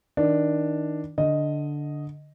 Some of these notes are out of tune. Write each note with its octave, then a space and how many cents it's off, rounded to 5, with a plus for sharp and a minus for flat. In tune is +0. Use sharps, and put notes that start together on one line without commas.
D#3 +15 D4 +0
D3 +0 D#5 +0